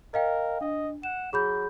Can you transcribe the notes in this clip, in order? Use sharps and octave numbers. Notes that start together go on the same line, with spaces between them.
A#4 D#5 F5 G5
D4 D#5
F#5 E7
F#3 G#4 B5 G6